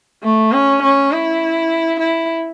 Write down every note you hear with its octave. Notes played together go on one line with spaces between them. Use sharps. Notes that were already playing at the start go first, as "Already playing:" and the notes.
A3
C#4
C#4
E4
E4